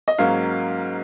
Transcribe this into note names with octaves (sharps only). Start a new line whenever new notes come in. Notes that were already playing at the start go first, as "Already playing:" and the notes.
D#5
G#2 F#3 A#3 C#4 F5